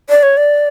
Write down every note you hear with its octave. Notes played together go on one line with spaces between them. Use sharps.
D5
C#5
D5